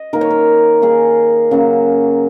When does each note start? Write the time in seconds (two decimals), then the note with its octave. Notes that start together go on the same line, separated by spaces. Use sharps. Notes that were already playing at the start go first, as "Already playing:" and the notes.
Already playing: D#5
0.13 D#3 A#3 A#4
0.21 C#5
0.31 A#4
0.82 D#3 A#3 G#4
1.51 C#3 F#3 A#3